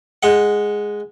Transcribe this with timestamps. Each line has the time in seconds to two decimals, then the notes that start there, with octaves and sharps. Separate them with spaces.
0.23 G#3 F#5